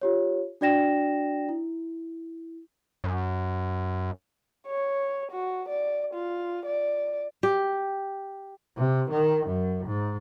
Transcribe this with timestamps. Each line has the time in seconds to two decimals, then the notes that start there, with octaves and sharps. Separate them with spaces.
0.01 F4 G4 C#5
0.61 D4 F#4 D5 G5 A#6 E7
1.49 E4
3.04 F#2
4.67 C#5
5.31 F#4
5.69 D5
6.14 F4
6.65 D5
7.43 G4
8.78 C3
9.11 D#3
9.47 F#2
9.87 G#2